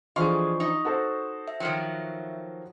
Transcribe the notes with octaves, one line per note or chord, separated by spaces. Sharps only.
E3 F3 D4 G#4 D#5 F5 C6 C#6
D#4
F#4 A4 C5
E5
D#3 F3 F#3